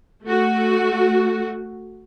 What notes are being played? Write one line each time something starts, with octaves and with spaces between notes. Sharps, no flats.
A3 F#4